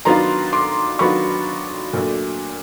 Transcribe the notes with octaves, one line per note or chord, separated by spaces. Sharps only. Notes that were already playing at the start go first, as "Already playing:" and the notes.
D#3 F#3 B3 D4 F4 A#5 C6
C6 D6
D#3 F#3 B3 D4 F4 B5 C#6
A#2 F#3 A3 D4